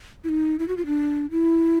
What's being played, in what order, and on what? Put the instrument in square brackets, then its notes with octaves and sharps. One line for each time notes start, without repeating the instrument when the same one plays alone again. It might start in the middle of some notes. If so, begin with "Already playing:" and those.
[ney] E4
D#4
E4
F#4
F4
D4
E4